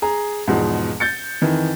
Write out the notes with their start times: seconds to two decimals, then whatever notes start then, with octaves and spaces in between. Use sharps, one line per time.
0.02 G#4 A#5
0.47 E2 G#2 B2 F3
1.00 G6 A6 C#7
1.42 F2 D#3 E3